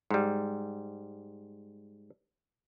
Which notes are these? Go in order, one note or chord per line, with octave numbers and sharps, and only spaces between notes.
G#2 G3